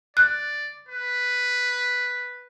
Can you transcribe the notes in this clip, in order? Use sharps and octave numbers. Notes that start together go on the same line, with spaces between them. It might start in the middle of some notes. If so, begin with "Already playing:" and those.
D5 F#6
B4